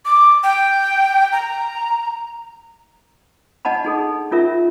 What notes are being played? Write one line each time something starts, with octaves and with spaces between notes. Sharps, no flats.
D6
G5
A#5
D4 D#5 F#5 A5 B5
D#4 G#4 A4
C#4 F4 A#4 E5